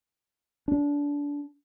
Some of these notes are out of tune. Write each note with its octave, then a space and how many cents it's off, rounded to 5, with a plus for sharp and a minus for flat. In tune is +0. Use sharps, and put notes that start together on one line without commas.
D4 -25